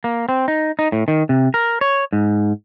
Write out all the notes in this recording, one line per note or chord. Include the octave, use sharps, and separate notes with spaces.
A#3
C4
D#4
D#4
A2
D#3
C3
A#4
C#5
G#2